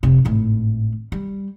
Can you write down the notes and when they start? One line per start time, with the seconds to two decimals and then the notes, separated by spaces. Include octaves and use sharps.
0.03 F1 C3
0.25 G#1 A2
1.12 G3